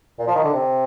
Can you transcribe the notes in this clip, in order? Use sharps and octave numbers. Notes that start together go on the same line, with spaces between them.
A#2
F3
D#3
D3
C3